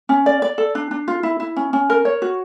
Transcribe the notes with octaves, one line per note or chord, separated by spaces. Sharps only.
C#4
D5
D5
A4
D4
D4
F4
E4
E4
C#4
C#4
A#4
C#5
F#4